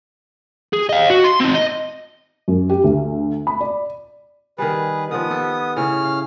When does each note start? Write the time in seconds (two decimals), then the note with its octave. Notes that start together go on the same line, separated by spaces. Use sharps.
0.73 G#4
0.89 D#5 F5
1.10 F#4
1.24 C6
1.41 C4 D#4
1.55 D#5
2.48 F#2
2.69 G4
2.84 D2
3.47 B5
3.61 D5
4.58 D#3 G3 G#4 B4
5.11 D#3 F3 B3 D#6
5.31 G4 A4
5.77 A2 C#3 C#4 F6
6.04 F5